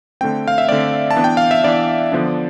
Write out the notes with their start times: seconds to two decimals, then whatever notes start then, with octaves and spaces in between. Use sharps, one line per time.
0.21 D3 A3 C4 G5
0.48 F5
0.58 E5
0.69 D3 A3 C4 D5
1.11 A5
1.16 E3 B3 D4
1.24 G5
1.37 F5
1.51 E5
1.64 E3 B3 D4 D5
2.12 D3 F3 B3 D4